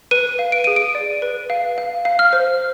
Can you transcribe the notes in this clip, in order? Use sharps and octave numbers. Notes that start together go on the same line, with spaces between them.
B4 D#7
F5
D7
G#4 D#7
D7
D5
B4
F5
F5
F5
F6
C5